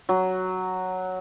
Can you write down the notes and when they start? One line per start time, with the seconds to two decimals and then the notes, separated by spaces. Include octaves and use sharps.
0.09 F#3